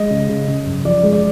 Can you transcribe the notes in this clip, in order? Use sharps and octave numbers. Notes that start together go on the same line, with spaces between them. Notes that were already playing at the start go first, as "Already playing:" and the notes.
Already playing: G#3 D#5
C#3
C#3
C#3
F#2
F3 D5
G#3
D5